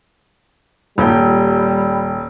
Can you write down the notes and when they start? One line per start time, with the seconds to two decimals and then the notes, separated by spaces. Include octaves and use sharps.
0.98 D#1 G3 G5